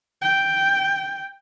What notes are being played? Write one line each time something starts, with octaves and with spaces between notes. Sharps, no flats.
G5